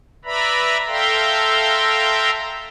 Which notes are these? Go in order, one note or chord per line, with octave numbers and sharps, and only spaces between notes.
B4 D5 E5 A#5 B5
A4 E5 F5 G5 A#5 C6